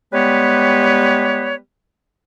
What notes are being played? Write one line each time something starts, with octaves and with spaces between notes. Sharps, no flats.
G3 G#3 B3 G4 B4 C#5